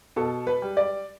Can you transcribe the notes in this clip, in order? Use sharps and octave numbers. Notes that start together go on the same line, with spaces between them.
B2 A4
B4
G3
D5